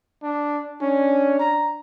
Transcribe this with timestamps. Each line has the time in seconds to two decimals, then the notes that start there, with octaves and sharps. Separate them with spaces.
0.23 D4
0.81 C#4 D4
1.39 A#5